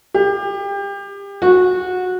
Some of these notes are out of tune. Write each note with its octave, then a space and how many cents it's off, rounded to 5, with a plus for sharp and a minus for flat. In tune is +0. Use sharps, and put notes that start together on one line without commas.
G4 +30
F#4 -20